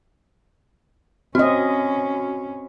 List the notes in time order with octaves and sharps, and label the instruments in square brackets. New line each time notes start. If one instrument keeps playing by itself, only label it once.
[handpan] C4 D#5 [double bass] C#4 [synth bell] F#4